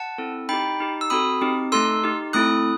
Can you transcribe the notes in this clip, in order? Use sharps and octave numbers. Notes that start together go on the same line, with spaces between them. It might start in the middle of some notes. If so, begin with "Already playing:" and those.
Already playing: F#5 A5
C4 E4 A4
D#4 G4 G5 B5
D#4 G4
E6
C4 F#4 A4 B5 D#6
C4 D#4 G4
A3 D#4 A4 C6 E6
D#4 G4
A3 C4 E4 A4 D#6 F#6